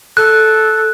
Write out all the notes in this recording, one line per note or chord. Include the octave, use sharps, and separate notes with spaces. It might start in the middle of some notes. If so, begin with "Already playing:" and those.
A4 F#6